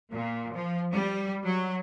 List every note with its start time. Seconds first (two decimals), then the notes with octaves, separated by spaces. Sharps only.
0.12 A#2
0.55 F3
0.93 G3
1.45 F#3